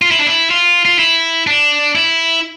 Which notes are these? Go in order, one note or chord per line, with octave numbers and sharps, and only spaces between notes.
F4
E4
D4
E4
F4
F4
E4
D4
E4